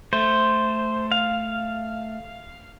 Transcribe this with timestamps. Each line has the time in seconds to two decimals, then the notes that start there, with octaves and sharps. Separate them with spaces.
0.13 A3 C5
1.11 F5